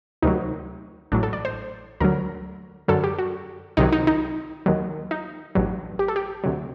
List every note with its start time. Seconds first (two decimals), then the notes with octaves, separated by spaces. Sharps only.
0.22 D2 C3 D#3 F#3 D#4
1.12 A1 A2 F#3 D4
1.23 A4
1.33 D5
1.45 C5
2.00 D2 D3 F#3 A#4
2.88 F#2 D3 F#3 A4
3.04 G4
3.18 F#4
3.77 C2 C3 D#3 F#3 D#4
3.92 D#4
4.07 D#4
4.66 D#2 D#3 F#3
5.11 D#4
5.55 A1 G2 F#3
5.99 G4
6.08 A4
6.16 G4
6.44 D2 C3 F#3